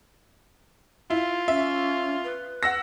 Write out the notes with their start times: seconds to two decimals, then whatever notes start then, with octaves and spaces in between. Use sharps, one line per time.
1.10 E4 F4
1.48 C#4 E5
2.24 B4
2.63 F#5 E6 A#6